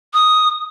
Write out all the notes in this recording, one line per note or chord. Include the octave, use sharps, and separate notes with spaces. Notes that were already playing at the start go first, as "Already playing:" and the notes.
D#6